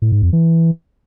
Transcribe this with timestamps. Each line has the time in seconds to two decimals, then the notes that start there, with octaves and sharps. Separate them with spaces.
0.02 A2
0.12 G#2
0.22 F2
0.33 E3